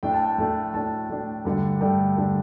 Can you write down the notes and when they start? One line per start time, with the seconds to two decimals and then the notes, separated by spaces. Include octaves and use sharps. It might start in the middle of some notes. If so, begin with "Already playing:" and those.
0.03 A2 A3 D4 G5
0.13 A5
0.24 G5
0.38 A2 A3 D4 A5
0.74 A2 A3 D4 A5
1.09 A2 A3 D4
1.45 G2 D3 A3 D4
1.81 G2 D3 A3 D4 G5
2.17 G2 D3 A3 D4